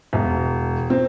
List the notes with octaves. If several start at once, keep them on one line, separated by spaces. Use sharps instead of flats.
E1
C4